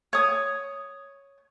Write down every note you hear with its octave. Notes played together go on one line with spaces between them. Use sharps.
C#5 D#6